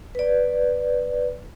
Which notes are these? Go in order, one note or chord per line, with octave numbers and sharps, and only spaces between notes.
B4 D5